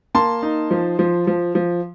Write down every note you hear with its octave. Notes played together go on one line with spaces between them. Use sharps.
A#3 A5 C6
D#4
F3
F3
F3
F3